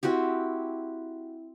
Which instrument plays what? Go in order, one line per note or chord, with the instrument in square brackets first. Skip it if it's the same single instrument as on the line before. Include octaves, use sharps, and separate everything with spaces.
[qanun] C4 E4 F#4 G4